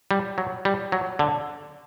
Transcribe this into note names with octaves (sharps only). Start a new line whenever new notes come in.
G3
F#3
G3
F#3
D3